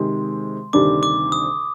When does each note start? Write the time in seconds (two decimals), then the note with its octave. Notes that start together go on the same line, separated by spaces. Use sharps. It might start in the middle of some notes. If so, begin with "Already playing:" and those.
Already playing: C3 D#3 G#3 C6
0.73 D2 C3 D#3 G3 D4 D6
1.03 D6
1.32 D#6